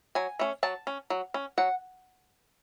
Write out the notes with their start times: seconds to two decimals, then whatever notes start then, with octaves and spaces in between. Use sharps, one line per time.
0.15 F#3 G#5
0.39 A3 C#4
0.63 F#3 A5
0.87 C#4
1.10 F#3
1.34 C#4
1.58 F#3 F#5